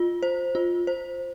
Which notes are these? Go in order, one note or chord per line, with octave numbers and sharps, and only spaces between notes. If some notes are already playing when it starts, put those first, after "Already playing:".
Already playing: F4
C5
F4
C5